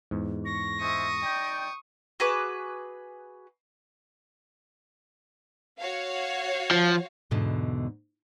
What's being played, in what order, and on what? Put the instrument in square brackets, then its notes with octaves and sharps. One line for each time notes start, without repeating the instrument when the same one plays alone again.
[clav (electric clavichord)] E2 G#2
[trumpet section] C#6 [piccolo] A#6
[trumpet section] G#3 C5 E5 [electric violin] C#6 D#6
[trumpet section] D#4 D5 G5
[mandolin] F#4 G#4 B4 D6
[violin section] F#4 C#5 F5
[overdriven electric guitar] F3
[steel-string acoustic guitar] E2 G#2 B2 D3